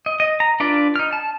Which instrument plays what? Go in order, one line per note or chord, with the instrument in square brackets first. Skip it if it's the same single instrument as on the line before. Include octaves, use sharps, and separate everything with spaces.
[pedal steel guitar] D#5
D#5
A#5
D4 F4 B4 D5
D#4 F6
A5